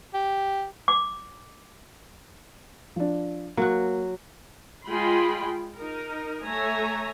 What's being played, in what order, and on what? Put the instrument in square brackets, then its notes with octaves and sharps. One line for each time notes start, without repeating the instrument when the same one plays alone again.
[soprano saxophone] G4
[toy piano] D6
[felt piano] F3 D4
[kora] F#3 F#4 [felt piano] A#3
[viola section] G#3 F4 G#4 G5 B5 C6
D#4 A#4
A3 C#5 E5 G#5 A#5